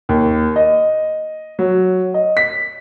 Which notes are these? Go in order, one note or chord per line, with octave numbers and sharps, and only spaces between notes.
D#2
D#5
F#3
D#5
B6